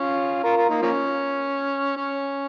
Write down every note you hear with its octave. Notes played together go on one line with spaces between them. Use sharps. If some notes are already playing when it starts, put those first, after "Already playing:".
Already playing: C#4 F4
F4 A#4
F4 A#4
A#3 D#4
F3 A#3 C#4
C#4